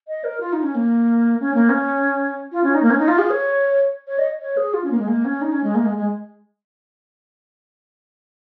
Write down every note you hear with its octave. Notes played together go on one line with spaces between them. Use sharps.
D#5
A#4
F4
D#4
C#4
A#3
C#4
A#3
C#4
F4
C#4
D#4
A#3
C#4
D#4
F4
G#4
C#5
C#5
D#5
C#5
G#4
F4
C#4
A#3
G#3
A#3
C#4
D#4
C#4
G#3
A#3
G#3
G#3